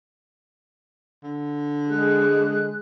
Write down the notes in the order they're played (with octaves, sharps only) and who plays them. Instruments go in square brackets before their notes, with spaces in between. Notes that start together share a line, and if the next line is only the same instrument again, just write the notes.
[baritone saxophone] D3
[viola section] G#3 [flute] F#6